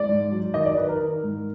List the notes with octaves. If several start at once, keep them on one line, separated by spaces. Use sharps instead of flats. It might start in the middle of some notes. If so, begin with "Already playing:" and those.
Already playing: G#3 D5
G#2
F#3
D#3 D#5
D5
D#3 B4
A#4
D#3
G#2